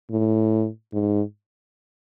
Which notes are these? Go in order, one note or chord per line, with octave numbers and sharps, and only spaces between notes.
A2
G#2